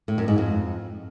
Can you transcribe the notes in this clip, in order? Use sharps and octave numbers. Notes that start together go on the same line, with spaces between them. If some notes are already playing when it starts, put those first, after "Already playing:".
A2
F#2
G#2
F2